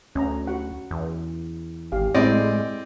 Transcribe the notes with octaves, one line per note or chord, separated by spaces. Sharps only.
D2 C#4 A#5
F#4 F#5
E2
G#1 G4 F5 G#5
A2 G#3 C4 E4 D5 D#5